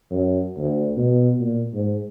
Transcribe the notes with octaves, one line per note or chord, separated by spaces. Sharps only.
F#2
D2
B2
A#2
G#2